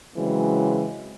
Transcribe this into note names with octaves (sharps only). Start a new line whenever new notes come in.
C#3 E3 F#3 G#3 C4